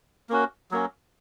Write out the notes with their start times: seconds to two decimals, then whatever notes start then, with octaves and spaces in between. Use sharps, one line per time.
0.29 A#3 C#4 F#4
0.71 F#3 A#3 C#4